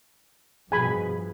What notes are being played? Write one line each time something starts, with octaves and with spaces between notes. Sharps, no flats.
G2 B2 F3 G#4 G#5 B5